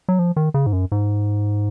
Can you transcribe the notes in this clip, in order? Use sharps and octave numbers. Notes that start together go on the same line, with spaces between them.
F#3
F3
D#3
C#3
G#2
F#2
G#2